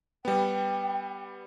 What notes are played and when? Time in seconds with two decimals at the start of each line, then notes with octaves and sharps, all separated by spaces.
0.25 G3 B3 G5